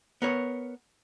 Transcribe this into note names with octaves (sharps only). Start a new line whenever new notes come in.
B3 A#4 C#5